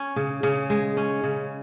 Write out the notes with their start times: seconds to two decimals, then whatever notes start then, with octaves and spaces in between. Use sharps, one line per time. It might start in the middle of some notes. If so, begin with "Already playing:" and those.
Already playing: C#4
0.16 C#3
0.43 C#3
0.70 G#3
0.97 C#4
1.23 C#3